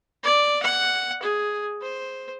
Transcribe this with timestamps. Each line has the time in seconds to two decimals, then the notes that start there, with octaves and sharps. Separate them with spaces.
0.23 D5
0.63 F#5
1.22 G#4
1.82 C5